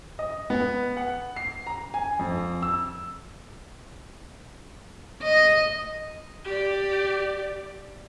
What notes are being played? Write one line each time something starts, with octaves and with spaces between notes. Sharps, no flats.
D#5
B3
F#5
C7
A#5
G#5
F2
E6
D#5
G4 D5